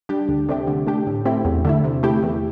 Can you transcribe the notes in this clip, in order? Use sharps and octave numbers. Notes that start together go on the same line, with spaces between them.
G3 D4 G4
D2
C3 A3 D4 G4
D3
A3 D4 G4
A2
A3 C4 E4 G4
E2
D3 A3 E4
C3
A3 E4 G4
E2